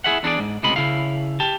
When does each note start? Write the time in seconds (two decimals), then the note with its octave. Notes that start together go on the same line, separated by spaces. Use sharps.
0.04 E4 G#4 E5 F#5
0.23 E2 D4 D#4 G#4 D5
0.39 G#2
0.63 C#2 A2 C3 D#5 B5
0.76 C#3 E4 F5
1.40 G4 A5